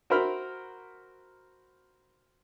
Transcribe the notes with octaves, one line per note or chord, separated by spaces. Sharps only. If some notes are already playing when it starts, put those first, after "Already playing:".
F#4 A#4 C5 E5 B5 F6